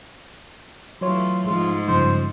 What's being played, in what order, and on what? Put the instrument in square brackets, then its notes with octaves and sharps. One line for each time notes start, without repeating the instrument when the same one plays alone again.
[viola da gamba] E3 A3 [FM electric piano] F#3 C#5 [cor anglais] F4
[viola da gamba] G#2 [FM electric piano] F3 G#3 [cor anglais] F4
[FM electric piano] G2 C#3 F3 [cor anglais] C5